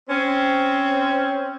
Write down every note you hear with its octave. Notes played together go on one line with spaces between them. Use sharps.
C4 C#4